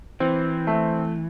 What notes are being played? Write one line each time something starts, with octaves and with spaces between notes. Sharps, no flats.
E3 C4
A3